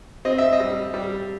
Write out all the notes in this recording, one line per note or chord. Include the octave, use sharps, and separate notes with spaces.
C4 D#5
E5
D#5
G3
G3